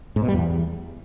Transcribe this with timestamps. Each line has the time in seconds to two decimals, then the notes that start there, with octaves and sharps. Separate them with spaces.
0.16 G#2
0.22 B2
0.28 G3
0.34 E2